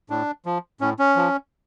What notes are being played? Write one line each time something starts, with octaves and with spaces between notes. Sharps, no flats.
A2 D4
F3
A2 C#4
C#4
F3